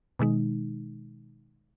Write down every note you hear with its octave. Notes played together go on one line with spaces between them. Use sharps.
B2 D#3 G#3 D#4